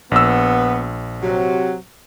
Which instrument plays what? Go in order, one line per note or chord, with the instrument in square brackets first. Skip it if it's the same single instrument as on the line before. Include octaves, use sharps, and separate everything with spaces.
[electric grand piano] A#1 E6 [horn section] B3
[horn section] C3 F#3